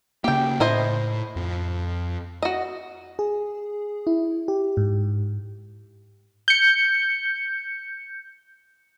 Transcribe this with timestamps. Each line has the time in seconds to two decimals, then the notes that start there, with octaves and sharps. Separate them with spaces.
0.24 C#3 A#3 G4 G5
0.60 A2 E4 C5 D#5
1.36 F2
2.43 F#4 D#5
3.19 G#4
4.07 E4
4.48 G4
4.77 G#2
6.48 G6 C#7